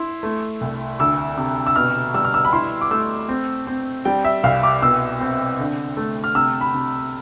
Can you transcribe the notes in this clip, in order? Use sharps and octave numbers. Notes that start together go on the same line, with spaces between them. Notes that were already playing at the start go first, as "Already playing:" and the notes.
Already playing: E4 C6
A3
C2
D2 E6
C3
E6
B2 F6
G3 E6
F6
E6
B5
E4 C6
D6
A3 E6
C4
C4
G3 G5
E5
C2 F5
D6
B2 E6
C4
D3
A3
F6
C3 E6
B5
C3